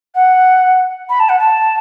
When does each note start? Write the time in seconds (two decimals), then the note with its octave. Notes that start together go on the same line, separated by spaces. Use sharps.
0.15 F#5
1.09 B5
1.19 A5
1.29 F#5
1.39 A5